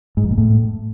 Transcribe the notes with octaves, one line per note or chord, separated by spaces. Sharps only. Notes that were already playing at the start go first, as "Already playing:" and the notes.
G#2
F2
A#2
A2